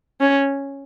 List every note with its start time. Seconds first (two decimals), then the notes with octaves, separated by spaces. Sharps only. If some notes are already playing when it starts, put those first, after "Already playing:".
0.20 C#4